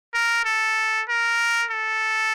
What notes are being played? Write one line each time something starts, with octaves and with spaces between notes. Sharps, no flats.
A#4
A4
A#4
A4